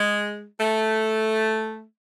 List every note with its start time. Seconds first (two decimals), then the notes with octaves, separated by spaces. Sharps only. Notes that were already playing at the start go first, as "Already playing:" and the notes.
Already playing: G#3
0.59 A3